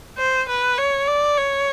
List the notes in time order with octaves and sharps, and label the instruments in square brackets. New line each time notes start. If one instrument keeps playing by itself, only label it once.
[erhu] C5
B4
C#5
D5
C#5